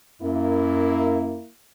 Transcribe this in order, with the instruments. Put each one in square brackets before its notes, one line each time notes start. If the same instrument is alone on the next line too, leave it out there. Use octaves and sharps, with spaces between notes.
[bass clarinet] F#2 [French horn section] A#3 E4